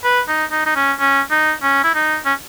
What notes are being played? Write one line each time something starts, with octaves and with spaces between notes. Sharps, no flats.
B4
D#4
D#4
D#4
C#4
C#4
D#4
C#4
E4
D#4
C#4